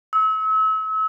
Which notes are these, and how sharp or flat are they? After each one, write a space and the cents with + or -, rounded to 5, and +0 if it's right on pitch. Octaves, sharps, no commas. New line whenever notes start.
E6 -35